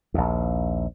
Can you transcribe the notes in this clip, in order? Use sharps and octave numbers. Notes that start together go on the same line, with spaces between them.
A#1 D#2